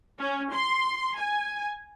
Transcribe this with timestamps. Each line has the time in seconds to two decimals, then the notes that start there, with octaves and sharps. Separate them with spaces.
0.19 C#4
0.53 C6
1.18 G#5